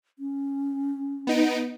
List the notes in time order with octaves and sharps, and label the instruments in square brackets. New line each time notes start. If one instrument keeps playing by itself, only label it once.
[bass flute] C#4
[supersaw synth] B3 D#4 D7